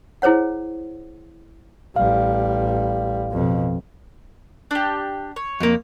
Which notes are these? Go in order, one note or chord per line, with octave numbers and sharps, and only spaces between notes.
E4 G#4 C5 C#5 F#5
A1 G3 F5
F2 B2
D4 G4
C#5
F2 A#3